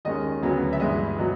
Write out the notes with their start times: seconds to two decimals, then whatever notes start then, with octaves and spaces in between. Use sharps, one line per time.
0.05 D#2 D#3 G#3 C#4 D#5
0.42 D2 C#3 F#3 B3
0.73 E5
0.80 G2 E3 G#3 D#5
1.19 B2 F#3